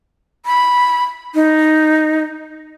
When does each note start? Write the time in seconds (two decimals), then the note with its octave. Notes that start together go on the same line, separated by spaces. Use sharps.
0.46 B5
1.35 D#4